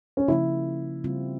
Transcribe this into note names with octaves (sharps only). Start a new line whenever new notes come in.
C#4
C#3 F3 A#3 E4
C#3 G3 C4 F4